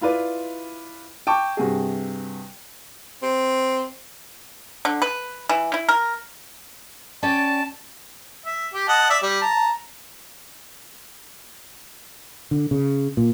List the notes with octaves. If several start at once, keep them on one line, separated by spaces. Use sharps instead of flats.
E4 F4 B4 D5
G5 A5 C#6 D6
G2 C3 F#4 G#4
C4
D3
B4
E3
E4
A#4
C#4 D5 G5 A5
E5
G4
D#5 F#5 A5
D5 E5
G3
A5 A#5
D3
C#3
A#2